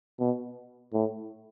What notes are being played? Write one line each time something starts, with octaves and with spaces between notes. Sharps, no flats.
B2
A2